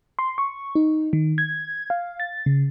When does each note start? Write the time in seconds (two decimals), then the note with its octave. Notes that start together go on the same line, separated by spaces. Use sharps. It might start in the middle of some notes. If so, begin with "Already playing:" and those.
0.19 C6
0.38 C#6
0.75 D#4
1.13 D#3
1.38 G#6
1.90 F5
2.20 A6
2.46 C#3